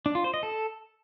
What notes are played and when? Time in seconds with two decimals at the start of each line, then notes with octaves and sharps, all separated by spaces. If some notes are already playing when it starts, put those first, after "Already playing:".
0.06 D4
0.15 F4
0.24 C5
0.34 D#5
0.43 A4